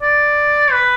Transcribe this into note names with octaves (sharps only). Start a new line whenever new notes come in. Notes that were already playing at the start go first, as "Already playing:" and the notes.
D5
B4